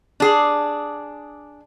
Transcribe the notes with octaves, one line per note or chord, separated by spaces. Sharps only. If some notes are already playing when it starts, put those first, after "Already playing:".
D4 G#4